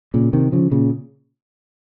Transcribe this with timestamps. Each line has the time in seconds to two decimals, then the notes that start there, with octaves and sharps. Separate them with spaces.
0.14 A#2 C#3
0.33 C3 D#3
0.52 C#3 F3
0.72 A#2 C#3